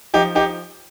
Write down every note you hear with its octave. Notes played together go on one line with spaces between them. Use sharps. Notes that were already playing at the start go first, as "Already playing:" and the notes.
F3 D#4 G4
D#4 G4